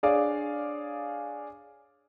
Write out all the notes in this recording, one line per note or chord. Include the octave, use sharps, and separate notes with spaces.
D4 G#4 C#5 D5 F5 D6